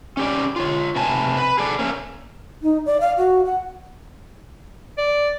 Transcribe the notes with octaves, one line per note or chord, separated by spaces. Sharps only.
C#4 G4 D5
F4 C#5
C3 B4 G#5 A5
B4
G#4 A4 D5
A3 A#3 C#4
D#4
D5
F5
F#4
F#5
D5